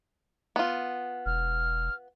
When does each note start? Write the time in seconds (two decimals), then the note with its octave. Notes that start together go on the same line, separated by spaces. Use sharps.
0.56 B3 F4
1.26 E1 F6